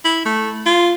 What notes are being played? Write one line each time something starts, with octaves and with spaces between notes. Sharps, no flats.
E4
A3
F4